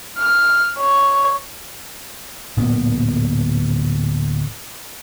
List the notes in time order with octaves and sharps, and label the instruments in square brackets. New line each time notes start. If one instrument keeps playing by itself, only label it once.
[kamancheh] F6
C#5
[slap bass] D1 D2 A#2 B3